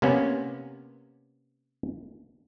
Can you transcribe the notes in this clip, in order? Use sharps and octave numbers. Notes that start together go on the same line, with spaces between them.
C3 A#3 B3 C#4